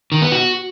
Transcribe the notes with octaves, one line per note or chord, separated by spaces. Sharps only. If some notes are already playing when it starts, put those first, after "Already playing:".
D#3
B3
F#4